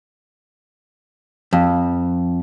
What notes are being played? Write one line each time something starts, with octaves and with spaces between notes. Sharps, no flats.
F2